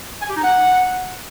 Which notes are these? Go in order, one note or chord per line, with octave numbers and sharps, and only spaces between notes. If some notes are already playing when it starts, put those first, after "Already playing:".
G#5
G4
D#4
F#5